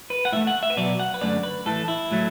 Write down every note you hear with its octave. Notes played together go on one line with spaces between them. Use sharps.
B4
F#5
A2 A3 E5
F#5
E5
B4
B2 F#3 B3 D5
F#5
B4
F#2 D3 A3 D5
B4
A2 E3 A3 A4
E4
A2 F#3 A3